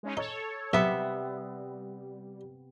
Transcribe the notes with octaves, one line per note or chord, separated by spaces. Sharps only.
G#3 C#4 D#4
D#4 A4 C#5
B1 C3 G3 B3 E5